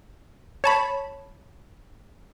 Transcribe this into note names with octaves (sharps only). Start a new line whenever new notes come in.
C#5 A5 B5